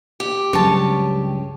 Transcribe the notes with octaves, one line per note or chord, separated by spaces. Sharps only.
G4
C#2 G2 C#3 F#3 C#5 A5